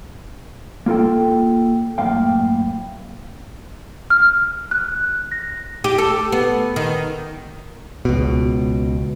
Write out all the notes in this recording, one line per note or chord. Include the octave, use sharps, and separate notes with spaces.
A#3 F4 A4 G5
F#2 A2 A#3 F5 G5
F6
F#6
A#6
G4
A4
B3
D#3
C#2 B2